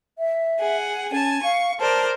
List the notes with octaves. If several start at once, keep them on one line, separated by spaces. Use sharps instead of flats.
E5
G#4 F#5
C#4 G#5 A5
F5 C#6
A#4 C5 D5 A5